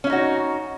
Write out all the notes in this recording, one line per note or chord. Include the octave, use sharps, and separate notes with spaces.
C#4 D#4 E4 F#4